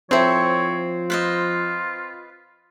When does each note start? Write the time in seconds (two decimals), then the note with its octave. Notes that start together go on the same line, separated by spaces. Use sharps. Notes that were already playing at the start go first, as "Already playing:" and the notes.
0.11 F3 C4 E4 A4 C#5
1.10 F4 B4 C5 D#5